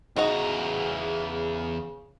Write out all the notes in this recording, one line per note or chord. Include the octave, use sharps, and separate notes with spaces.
E2 C#3 D#4 F#4 D#5 A#5